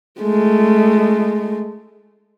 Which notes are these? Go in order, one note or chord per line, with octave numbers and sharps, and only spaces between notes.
G#3 A3